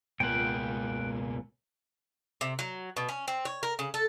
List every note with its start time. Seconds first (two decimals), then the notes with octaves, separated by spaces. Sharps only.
0.20 C#2 B2 A#3 F#5 G5
2.41 C3
2.59 F#3
2.97 B2
3.09 C#4
3.28 C4
3.45 C#5
3.63 A#4
3.79 C#3
3.94 A4